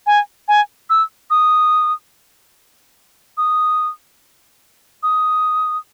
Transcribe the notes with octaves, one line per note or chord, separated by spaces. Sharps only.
G#5
G#5
E6
D#6
D#6
D#6